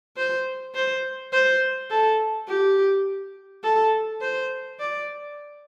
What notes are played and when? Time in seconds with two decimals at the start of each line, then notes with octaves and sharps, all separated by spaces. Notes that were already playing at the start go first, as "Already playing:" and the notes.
0.16 C5
0.74 C5
1.32 C5
1.90 A4
2.48 G4
3.63 A4
4.21 C5
4.79 D5